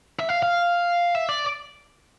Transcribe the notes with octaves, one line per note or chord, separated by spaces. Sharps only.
E5
F5
F5
E5
D5